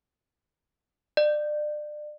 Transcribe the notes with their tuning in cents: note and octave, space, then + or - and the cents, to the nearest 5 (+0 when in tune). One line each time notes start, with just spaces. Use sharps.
D5 +30